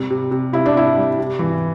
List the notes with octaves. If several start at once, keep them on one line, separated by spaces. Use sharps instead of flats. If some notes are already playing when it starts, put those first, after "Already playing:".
Already playing: C3 G3
C3
C3
C3 E4
D4
C3 E4
G3
C3
E3